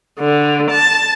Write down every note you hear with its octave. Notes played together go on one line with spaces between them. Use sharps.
D3
A5